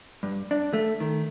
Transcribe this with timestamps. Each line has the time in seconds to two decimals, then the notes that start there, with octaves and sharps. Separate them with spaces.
0.23 G2
0.51 D4
0.73 A3
1.00 D#3